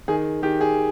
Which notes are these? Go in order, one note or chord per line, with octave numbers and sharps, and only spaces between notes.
D#3 G#4
D#3 G4
G#4